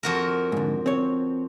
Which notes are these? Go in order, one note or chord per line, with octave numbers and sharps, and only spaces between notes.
F2 F#4 A#4
G#2 D3
C4 C#5